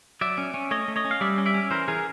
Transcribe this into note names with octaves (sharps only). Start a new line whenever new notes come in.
F#3 D5 E5
C#4
C#4
A3 C#5 D#5
A3
C#5 D#5
C#4
F5
G3 D5 E5
C#4
D5 E5
C#4
E3 A#4 C5
E3 G#4 A#4